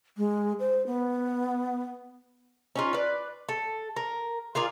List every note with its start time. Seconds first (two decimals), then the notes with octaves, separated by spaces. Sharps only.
0.17 G#3
0.60 C5
0.87 B3
2.76 C#4 D#4 F4
2.93 B4 D5
3.49 A4
3.96 A#4
4.55 F4 G#4 A#4 D5